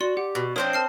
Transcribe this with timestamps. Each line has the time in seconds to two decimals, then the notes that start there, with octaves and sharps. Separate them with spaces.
0.01 F#4 D5 C6
0.17 G4 F#5
0.35 B2
0.56 C4 D4 A#4 C5 C#5 D#5
0.73 A5 F6 C7